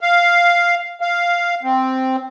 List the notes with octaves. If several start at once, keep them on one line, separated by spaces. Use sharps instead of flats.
F5
F5
C4